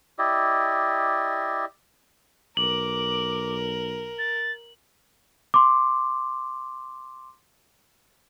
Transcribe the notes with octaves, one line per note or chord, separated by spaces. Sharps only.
E4 G4 D5 D#5
B1 A#4 D6 F#7
A6
C6 D6